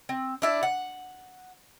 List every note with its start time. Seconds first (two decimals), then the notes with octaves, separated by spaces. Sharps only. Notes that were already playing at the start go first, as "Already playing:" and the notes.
0.09 C4
0.42 D4 E4 D5
0.63 F#5